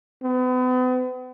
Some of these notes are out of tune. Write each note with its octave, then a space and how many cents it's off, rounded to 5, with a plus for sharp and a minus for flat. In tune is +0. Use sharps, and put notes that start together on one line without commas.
B3 +40